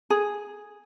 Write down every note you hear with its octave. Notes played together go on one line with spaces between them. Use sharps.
G#4